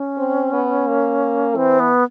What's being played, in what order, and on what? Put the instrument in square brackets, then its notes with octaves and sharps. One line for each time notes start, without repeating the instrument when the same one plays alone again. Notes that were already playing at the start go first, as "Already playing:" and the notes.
Already playing: [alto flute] C#4
[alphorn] C4
B3
A#3
[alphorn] E3 [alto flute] C4
[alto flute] B3